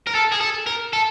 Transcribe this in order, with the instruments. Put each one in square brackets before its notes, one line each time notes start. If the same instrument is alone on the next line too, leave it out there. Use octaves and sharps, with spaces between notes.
[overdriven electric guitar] A#4
A4
G#4
A4
A#4
A4